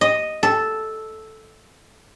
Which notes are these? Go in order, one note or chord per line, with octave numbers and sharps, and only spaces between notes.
D#5
A4